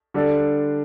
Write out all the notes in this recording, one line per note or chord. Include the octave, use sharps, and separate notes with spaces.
D3 G3 D4 A4 D5